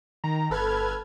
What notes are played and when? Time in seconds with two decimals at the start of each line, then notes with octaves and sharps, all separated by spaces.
0.24 D#3 A#5
0.50 G1 A4 B4 F6 G#6